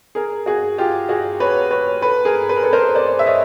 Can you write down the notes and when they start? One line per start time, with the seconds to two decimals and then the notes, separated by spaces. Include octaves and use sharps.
0.15 G#4 A#4
0.46 F#4 G#4
0.78 F4 G4
1.09 F#4 G#4
1.40 B4 C#5
1.71 B4 C#5
2.02 A4 B4
2.25 G#4 A#4
2.49 B4
2.56 A#4
2.63 A4 B4
2.73 A#4 C5
2.95 C5 D5
3.19 E5
3.26 C#5 D#5